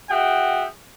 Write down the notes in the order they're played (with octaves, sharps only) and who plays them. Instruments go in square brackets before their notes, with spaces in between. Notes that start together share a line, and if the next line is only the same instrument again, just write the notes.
[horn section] F#4 G#4 E5 F#5 G5